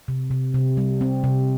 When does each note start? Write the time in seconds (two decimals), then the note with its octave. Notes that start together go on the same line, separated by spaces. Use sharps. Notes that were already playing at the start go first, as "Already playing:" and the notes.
0.08 C3
0.31 C3
0.54 C3
0.77 G3
1.01 C4
1.24 C3